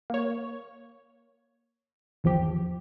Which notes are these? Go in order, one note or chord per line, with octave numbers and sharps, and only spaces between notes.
A#3 C#5
G#1 E2 F3 G4